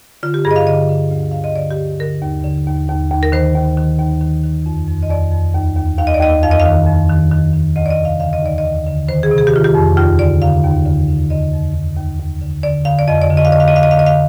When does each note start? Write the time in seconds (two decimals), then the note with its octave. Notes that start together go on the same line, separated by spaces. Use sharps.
0.23 D3 F4
0.34 G4
0.45 G2 G#4
0.51 D#5
0.56 F5
0.67 D3 D#5
0.89 D3
1.11 D2
1.31 D3 F5
1.44 D#5
1.56 D3 D5
1.71 G4
1.78 D2
2.00 D3 A#4
2.22 D#2
2.44 D3
2.67 D#2
2.89 D#2
3.11 D#2
3.23 A#4
3.32 D#3 C5
3.55 D#2
3.77 D#3
3.99 D#2
4.21 D#3
4.44 D#3
4.66 F2
4.88 F2
5.03 D#5
5.10 F2 D5
5.32 F2
5.55 D#2
5.77 D#2
5.98 D#2 F5
6.07 D#5
6.14 D5
6.20 D#2 D#5
6.43 F2 F5
6.51 D#5
6.60 F5
6.66 D#3
6.87 F2
7.09 D#3
7.32 D#3
7.53 D#3
7.76 D2 D#5
7.86 D5
7.91 D#5
7.98 C3
8.05 F5
8.20 D3 F5
8.33 D#5
8.42 D#2 D5
8.58 D#5
8.64 D#2
8.87 D3
9.09 D#3 C5
9.23 G#4
9.31 C3
9.38 G#4
9.47 G4
9.53 D#3 F4
9.64 G4
9.75 F2
9.97 D#2 F4
10.19 D3 D5
10.42 D3 F5
10.64 D#2
10.85 D3
11.08 D3
11.30 D3 D#5
11.52 F2
11.74 D#2
11.97 D#2
12.19 D#2
12.41 D3
12.63 D3 D5
12.85 D3 F5
12.99 D5
13.08 F2 D#5
13.21 D5
13.30 D3
13.37 D#5
13.45 F5
13.52 D3 D#5
13.60 F5
13.68 D#5
13.74 D3 F5
13.83 D#5
13.91 F5
13.96 D3 D#5
14.06 F5